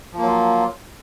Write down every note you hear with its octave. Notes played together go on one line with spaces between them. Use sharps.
F3 F#3 A#3 F4